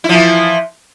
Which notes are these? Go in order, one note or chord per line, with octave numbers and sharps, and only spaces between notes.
E3 F3 E4